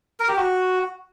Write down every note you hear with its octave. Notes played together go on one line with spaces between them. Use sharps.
A#4
G4
F#4